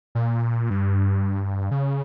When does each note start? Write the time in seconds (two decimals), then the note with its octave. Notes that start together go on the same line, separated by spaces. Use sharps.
0.15 A#2
0.70 G2
1.71 C#3